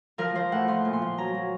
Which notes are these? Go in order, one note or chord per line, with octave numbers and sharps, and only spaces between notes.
F3 A#4
F3 C5
A2 F#5
F3 C6
A#2
C6
F3
F#3 A#5
F#3